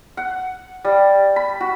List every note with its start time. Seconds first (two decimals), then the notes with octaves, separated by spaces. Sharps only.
0.17 F#5
0.85 G3
1.36 B5
1.60 F#4